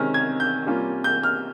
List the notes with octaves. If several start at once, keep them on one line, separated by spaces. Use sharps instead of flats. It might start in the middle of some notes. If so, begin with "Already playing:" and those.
Already playing: C3 D#3 G#3 C#4 F6
G#6
G6
C3 G3 A#3 C#4 F4
G6
F6